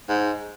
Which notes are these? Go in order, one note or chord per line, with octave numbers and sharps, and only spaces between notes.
G#2